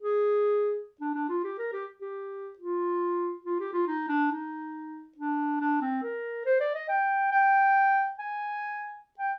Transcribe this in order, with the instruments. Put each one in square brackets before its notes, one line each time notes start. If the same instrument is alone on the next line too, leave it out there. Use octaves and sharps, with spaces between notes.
[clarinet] G#4
D4
D4
F4
G4
A#4
G4
G4
F4
F4
G4
F4
D#4
D4
D#4
D4
D4
C4
A#4
C5
D5
D#5
G5
G5
G#5
G5